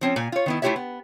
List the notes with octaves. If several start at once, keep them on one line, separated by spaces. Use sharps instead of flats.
F3 C4 C#4
A#2 G#5
F4 C#5
D#3 B3 E4
A3 E4 F4 G4 C#5 E5
B3